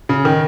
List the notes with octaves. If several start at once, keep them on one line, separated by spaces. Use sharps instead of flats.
C#3
D#3